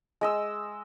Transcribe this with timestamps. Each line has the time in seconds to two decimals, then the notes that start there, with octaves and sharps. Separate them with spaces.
0.21 G#3 D#5 E6